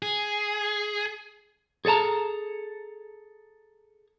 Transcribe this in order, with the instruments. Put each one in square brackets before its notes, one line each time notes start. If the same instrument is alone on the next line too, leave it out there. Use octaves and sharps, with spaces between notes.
[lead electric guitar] G#4
[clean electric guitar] G#4 A4 C#5 A5 A#5